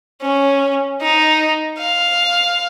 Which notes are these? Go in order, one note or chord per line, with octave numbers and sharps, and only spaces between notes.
C#4
D#4
F5